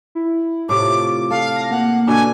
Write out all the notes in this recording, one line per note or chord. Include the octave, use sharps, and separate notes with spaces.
E4
A2 C3 F4 D6
A4 F5
A#6
A#3 F#5
B2 D3 D4 G#5